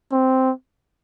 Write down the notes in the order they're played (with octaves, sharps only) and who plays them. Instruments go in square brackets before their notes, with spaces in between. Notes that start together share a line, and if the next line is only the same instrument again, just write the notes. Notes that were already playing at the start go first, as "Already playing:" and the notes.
[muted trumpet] C4